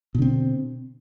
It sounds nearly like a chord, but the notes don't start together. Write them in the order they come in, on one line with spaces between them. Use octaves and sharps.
B2 D3 C4